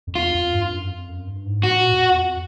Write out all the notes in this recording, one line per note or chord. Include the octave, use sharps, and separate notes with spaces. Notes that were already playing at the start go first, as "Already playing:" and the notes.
F2
E2 F4
F2
G2
F#2
F2
F#2
G2
G#2
A2 F#4
A#2
E2
F2
E2
F2